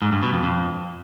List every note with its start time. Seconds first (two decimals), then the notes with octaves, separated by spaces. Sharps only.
0.02 G#2
0.12 G2
0.22 B2
0.33 F2
0.43 F2